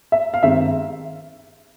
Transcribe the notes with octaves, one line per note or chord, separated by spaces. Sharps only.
E5
F5
G2 D#3 G#3 C4 E5